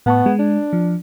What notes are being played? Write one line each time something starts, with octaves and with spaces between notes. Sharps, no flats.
A2 B3 A5 C#6
G#3
D4
F3